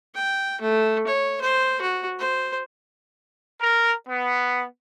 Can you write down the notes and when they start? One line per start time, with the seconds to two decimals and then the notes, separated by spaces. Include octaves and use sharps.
0.15 G5
0.61 A3
1.07 C#5
1.41 C5
1.81 F#4
2.19 C5
3.61 A#4
4.09 B3